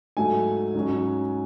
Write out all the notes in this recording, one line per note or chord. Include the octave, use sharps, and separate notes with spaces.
G#2 F#3 A3 G#5
G#2 F#3 C#4